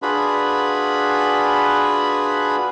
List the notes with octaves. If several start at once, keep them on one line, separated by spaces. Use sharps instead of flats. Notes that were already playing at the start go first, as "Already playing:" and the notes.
D4 F4 F#4 G#4 B4 B5